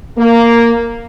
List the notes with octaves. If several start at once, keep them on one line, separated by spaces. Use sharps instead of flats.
A#3